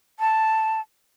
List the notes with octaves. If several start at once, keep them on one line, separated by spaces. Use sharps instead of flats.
A5